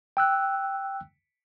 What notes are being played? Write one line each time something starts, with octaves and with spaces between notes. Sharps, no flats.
G5 E6 F#6